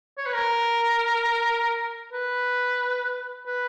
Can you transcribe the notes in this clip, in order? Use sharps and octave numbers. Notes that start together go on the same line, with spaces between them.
C#5
B4
A#4
B4
B4